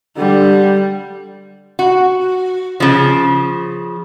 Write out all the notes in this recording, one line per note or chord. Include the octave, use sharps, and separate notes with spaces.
D3 G3
F#4
C#3 F3